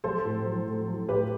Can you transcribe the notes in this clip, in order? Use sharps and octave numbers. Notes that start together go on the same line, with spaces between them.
F#3 A4 C5
A2
F#3
A2
F#3
A2 G4 B4